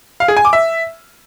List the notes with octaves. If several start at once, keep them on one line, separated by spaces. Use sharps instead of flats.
F5
G#4
G#5
D6
E5